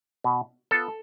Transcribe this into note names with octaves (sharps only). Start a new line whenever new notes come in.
B2
B3 F4 A4